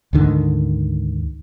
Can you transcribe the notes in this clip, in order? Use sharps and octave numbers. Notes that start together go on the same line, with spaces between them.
D2 G#2 D3 D#3